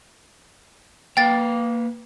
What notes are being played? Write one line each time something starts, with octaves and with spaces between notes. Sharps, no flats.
A#3 B4 F5 G5 A6